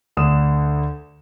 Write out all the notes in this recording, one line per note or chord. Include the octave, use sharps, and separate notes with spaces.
D2 D3 D#6 E7